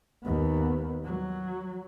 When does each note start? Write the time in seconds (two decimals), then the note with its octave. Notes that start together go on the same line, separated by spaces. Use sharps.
0.23 D#2 B3
1.04 F#3